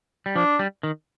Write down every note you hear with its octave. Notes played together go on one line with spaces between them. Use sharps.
G3
F3 D4
G3
D#3